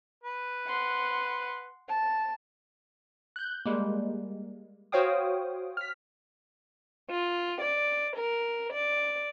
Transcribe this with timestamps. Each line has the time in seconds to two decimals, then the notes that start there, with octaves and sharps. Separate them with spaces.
0.24 B4
0.67 F#5 C6
1.88 A5
3.36 F#6 G6
3.66 G3 G#3 A#3
4.92 F#4 C5 C#5 F5 G5 D#6
5.77 F6 B6
7.09 F4
7.60 D5
8.15 A#4
8.72 D5